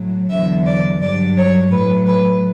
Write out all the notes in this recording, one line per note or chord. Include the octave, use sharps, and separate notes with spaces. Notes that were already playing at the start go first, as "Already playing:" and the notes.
Already playing: A2 F#3
E2 D3 F#3 E5
D5
G2 F#3 D5
C#5
A2 F#3 B4
B4